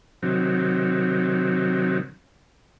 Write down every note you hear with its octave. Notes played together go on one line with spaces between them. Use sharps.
C3 D#3 F#3